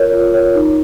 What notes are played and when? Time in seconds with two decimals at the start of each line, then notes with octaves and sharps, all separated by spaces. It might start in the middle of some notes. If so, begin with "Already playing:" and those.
Already playing: F4 A#4 C#5
0.12 F4
0.34 A#4 C#5
0.55 D#4